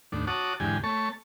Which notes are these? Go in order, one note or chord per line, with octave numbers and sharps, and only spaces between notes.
D#2 A2 D4
F#4 C#5 F#5 A5 D6 D#6
E2 G#2 D3 G4 G#5
A3 C#5 A5 C#6